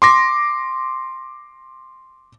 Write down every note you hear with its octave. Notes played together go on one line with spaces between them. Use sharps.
C6 D6 A#6